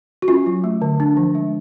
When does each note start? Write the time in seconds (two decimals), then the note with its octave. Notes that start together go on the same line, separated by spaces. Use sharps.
0.22 F#4
0.28 C#4 F4
0.46 F#3
0.64 A3
0.82 D3
1.00 D4
1.17 F3
1.35 G#3